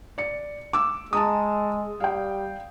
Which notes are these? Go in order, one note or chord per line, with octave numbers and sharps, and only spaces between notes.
D5 C#7
D6 E6
G#3 A5 A#5 D#6
G3 F5 G5